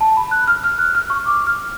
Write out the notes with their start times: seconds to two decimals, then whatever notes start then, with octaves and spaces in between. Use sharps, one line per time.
0.01 A5
0.17 B5
0.31 F#6
0.47 F6
0.64 F6
0.79 F#6
0.95 F6
1.10 C#6
1.26 D6
1.47 F6